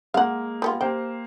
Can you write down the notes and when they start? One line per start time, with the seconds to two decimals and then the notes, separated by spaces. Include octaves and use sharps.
0.14 G#3 A#3 F5 F#5
0.62 G3 B3 F4
0.81 A#3 G4 C5 G5